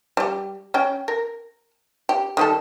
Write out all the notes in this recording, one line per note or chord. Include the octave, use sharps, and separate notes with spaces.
G3 G4
C#4 G5
A#4
G4
D#3 G3 A4